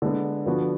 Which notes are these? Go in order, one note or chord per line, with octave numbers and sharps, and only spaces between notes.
D3 G#3 B3
D3 F3 B3 F#4